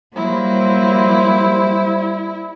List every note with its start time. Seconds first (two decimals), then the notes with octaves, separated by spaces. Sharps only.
0.16 F#3 G3 A#3 E4 C5